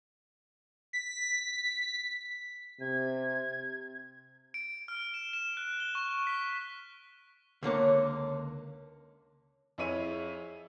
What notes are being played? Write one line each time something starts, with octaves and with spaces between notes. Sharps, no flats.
B6
C3 G#6
D7
F6
E7
E7
F#6
G7
C#6
B6
C#2 D3 A#3 C#5
F2 E4 G#4 C#5 D#7